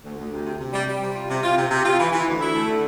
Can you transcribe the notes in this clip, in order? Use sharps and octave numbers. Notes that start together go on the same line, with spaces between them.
D2
D2
C3
C3
C3
G3
G3
C3
F4
C3
F4
C3
C3
F4
E3
E3
D2
E4
A3
D3